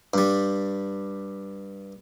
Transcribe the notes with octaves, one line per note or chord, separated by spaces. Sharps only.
G2 G3